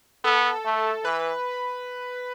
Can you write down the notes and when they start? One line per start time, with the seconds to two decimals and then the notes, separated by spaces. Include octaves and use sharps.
0.24 B3 A4
0.65 A3
1.05 E3 B4